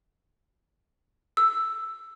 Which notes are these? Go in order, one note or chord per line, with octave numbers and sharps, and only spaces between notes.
E6